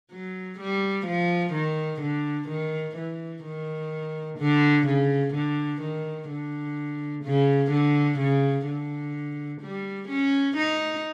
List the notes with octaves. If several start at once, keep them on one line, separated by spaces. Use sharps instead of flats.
F#3
G3
F3
D#3
D3
D#3
E3
D#3
D3
C#3
D3
D#3
D3
C#3
D3
C#3
D3
G3
C#4
D#4